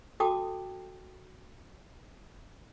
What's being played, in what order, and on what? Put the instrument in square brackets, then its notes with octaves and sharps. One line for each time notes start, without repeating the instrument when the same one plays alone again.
[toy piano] F#4 A4 G5 A5 D6 D#6